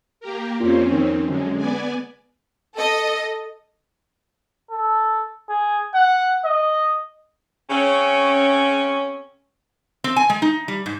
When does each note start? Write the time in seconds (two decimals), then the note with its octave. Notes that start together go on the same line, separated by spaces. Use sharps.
0.20 A#3 G4 A#4
0.60 F2 A#2 C4 C#4
0.92 D#3
1.27 F#2 D3 G#3
1.57 B3 D5 G#5
2.75 A4 D#5
4.71 A4
5.49 G#4
5.94 F#5
6.45 D#5
7.69 C#3 C4 C#4
10.04 C4
10.16 G#5
10.30 G#3
10.42 D#4
10.68 G3
10.86 G#2